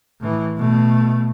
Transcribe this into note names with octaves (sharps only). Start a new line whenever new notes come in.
A2 E3
B2 A3